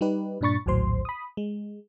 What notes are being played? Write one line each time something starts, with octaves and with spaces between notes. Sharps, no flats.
G3 D#4 G4 B4
G2 A#2 D4 B5 C#6 A6
A#1 D#2 A2 F#3 C5 C6
B5 D#6
G#3